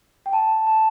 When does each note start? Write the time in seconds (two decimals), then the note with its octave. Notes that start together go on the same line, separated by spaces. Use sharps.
0.26 G5
0.33 A5
0.67 A5